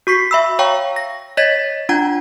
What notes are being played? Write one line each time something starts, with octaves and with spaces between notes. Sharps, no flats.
F#4 C#6 B6 C7
E5 B5 E6
C#5 F5 G5 A#5 C#6
A#6
C#5 D#5 G#6 A6 B6
D4 F4 F#5 A#5 G#6